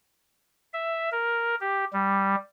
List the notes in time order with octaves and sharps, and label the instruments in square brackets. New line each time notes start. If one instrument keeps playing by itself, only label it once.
[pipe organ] E5
A#4
G4
G3